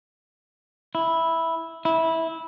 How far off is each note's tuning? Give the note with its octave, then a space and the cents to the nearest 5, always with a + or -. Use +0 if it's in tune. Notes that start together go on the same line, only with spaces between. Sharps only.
E4 -5
E4 -15